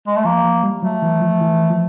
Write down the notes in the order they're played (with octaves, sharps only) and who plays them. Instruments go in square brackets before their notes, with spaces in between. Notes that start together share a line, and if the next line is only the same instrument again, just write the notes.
[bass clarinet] G#3
A3
[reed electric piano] F3 [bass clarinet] A#3
[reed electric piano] F3
G3
[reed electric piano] F#3 [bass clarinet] A3
[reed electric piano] E3
F3
E3
F3